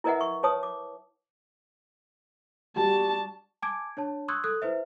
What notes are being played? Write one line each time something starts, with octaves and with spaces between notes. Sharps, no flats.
E4 A#4 B4 D#5 E5 F#5
C#6
B4 C#5 A5 D#6
D6
G3 F#4 A5
G#5 A5 D6 G#6 D7
D4 C#5 A5
C6 C#6 D#6 E6 F#6 G#6
A4 D#6 F#6
E4 B4 C5 E5